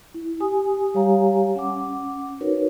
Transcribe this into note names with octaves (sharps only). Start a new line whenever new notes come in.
E4
G4 G#5 D#6
G3 G4 C#5 F5 G#5 A#5
C#4 F#5 D6
D#4 F#4 A#4 B4 C#5